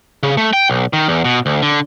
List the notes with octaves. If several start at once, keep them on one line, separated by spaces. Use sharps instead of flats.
C#3
A3
G5
B1
D#3
E2
B2
D2
D3